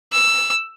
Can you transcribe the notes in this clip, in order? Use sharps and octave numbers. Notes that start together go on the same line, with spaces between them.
E6